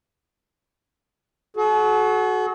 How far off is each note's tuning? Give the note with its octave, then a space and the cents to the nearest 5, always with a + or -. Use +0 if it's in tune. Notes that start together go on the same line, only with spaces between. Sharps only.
F#4 +0 A4 -45